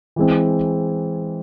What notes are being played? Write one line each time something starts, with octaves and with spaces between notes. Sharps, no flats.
E3 G#3 C4